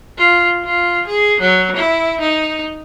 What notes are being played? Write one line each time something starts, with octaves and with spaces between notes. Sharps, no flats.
F4
F4
G#4
F#3
E4
D#4